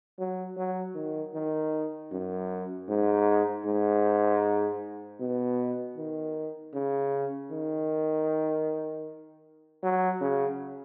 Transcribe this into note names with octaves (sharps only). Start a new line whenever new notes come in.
F#3
F#3
D#3
D#3
F#2
G#2
G#2
B2
D#3
C#3
D#3
F#3
C#3